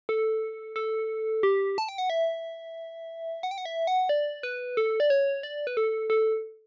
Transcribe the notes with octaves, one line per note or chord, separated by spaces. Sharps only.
A4
A4
G4
A5
G5
F#5
E5
F#5
G5
F#5
E5
F#5
D5
B4
A4
D5
C#5
D5
B4
A4
A4